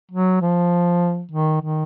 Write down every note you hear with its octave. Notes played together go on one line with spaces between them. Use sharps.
F#3
F3
D#3
D#3